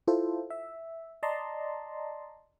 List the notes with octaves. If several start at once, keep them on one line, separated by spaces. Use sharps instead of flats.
E4 F4 A4 C5
E5
D5 D#5 A5 A#5 C6